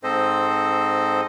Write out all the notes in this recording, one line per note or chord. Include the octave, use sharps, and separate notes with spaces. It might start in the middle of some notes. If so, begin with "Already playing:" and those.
G#2 C4 A4 C5 D#5